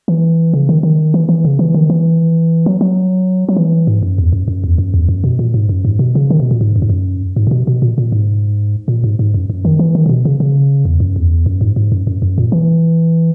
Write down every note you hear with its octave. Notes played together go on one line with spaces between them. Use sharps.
E3
C#3
D#3
D#3
E3
E3
C#3
E3
D#3
E3
F#3
F#3
F#3
E3
G#2
F#2
E2
F#2
F#2
E2
F#2
E2
F#2
B2
A#2
G#2
F#2
G#2
B2
C#3
D#3
B2
A#2
G#2
F#2
G#2
F#2
G#2
A#2
B2
B2
A#2
A#2
G#2
A#2
G#2
G#2
F#2
F#2
D#3
E3
D#3
C#3
B2
C#3
C#3
E2
F#2
E2
F#2
G#2
G#2
F#2
F#2
F#2
A#2
E3